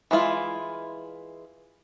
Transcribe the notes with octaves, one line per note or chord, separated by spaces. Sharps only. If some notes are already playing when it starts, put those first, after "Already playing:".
E3 G#3 E4 F4